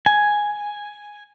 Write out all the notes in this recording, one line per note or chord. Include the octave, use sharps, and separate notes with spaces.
G#5